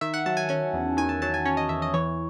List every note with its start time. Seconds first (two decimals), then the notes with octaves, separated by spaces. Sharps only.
0.01 D#3 E5
0.14 F#5
0.26 F#3 A5
0.37 G#5
0.49 C#4 G#5
0.73 E2
0.97 D#3 G#5
1.09 A5
1.22 F#3 A5
1.34 G#5
1.45 C#4 C#5
1.57 D#5
1.69 E2 E5
1.82 D#5
1.94 E3 C#5